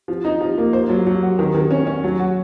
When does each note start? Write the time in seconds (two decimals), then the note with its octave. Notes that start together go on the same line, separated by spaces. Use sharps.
0.08 F3
0.25 D#4
0.41 F3
0.58 A#3
0.73 C5
0.89 F#3
1.07 F#3
1.23 F#4
1.39 D#3
1.54 D#3
1.71 C#4
1.87 C#4
2.04 F#3
2.19 F#4